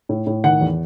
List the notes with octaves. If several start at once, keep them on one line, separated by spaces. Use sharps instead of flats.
A2
A2
D#3 F#5
E2